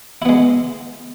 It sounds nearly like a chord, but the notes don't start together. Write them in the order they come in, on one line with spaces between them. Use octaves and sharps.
E4 B3 G#3